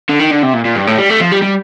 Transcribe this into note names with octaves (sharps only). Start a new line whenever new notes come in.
D3
D#3
D3
C3
A#2
A#2
G2
A2
G3
A3
F3
G3
G3